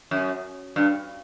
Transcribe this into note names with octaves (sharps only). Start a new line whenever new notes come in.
F#2
G2